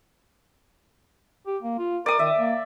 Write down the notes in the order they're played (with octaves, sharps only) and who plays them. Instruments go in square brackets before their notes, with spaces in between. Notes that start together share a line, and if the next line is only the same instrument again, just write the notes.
[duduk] G4
A#3
F4
[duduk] A#4 [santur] D5 D#6
[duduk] D#3 [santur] E5
[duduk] A#3